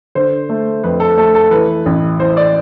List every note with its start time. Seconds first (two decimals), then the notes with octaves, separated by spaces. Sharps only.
0.15 D3 C5
0.49 A3
0.84 F2 B4
1.00 A4
1.17 A3 A4
1.35 A4
1.51 E3 B4
1.86 A1
2.19 E3 C5
2.37 D5